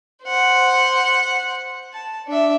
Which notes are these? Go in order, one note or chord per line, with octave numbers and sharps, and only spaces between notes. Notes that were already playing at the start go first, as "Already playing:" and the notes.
C5 F#5
A5
D4 E5